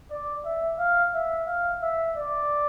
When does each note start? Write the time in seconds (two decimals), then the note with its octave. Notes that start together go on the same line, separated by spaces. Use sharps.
0.11 D5
0.45 E5
0.79 F5
1.14 E5
1.47 F5
1.82 E5
2.16 D5